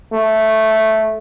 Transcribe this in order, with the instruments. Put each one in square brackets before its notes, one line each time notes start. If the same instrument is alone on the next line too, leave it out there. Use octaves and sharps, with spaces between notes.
[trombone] A3